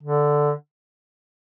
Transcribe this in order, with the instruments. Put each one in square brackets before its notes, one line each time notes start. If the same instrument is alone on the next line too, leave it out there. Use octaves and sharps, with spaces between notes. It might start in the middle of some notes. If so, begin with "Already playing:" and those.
[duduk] D3